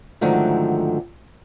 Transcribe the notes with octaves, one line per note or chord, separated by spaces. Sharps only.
G#2 D3 D#3 F3 F#3 A3